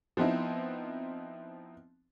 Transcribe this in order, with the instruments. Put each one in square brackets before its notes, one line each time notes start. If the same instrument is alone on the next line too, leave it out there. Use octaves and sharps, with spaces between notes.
[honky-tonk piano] F3 B3 C4 D#4 E4